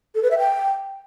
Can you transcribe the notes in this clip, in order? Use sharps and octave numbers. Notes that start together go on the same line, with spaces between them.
A4
B4
E5
G5